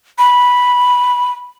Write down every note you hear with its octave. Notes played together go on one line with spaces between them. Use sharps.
B5